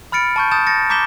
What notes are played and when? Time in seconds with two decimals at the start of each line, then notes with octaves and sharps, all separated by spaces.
0.12 B5 F6 A6 C#7 D7
0.36 A5 C#6 G6
0.51 A5 D#6 G6 A6 E7
0.67 A6 A#6 C#7
0.90 A#5 D6 G6 B6 E7 G7